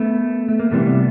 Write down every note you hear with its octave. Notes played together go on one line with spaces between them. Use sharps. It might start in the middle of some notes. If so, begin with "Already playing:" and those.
Already playing: A3 B3
A3
A#3
C3 E3 G3 A3 B3